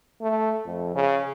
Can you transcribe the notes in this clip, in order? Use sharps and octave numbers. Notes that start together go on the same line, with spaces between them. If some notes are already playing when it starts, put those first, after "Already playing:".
A3
F2
C#3